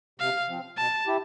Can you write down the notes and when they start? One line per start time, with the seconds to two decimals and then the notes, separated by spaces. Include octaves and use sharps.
0.19 C3 F5
0.48 F3 C4
0.77 B2 A5
1.07 E4 G4